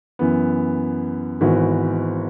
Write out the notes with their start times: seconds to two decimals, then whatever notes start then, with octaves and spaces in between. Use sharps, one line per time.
0.19 F#2 E3 B3
1.41 G#1 G#2 E3 B3 F#4